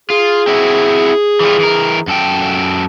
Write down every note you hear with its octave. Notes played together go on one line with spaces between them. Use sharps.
F4 G#4
C4 E4 F#4
E3 G3 F4
E3 A#4
F#2 A4 G5